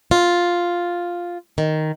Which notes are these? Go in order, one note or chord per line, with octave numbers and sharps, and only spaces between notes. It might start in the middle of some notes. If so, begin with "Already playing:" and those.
F4
D#3